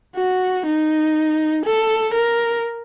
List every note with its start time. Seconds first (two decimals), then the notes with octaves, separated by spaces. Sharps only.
0.16 F#4
0.66 D#4
1.65 A4
2.14 A#4